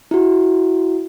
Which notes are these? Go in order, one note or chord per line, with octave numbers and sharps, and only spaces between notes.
E4 F#4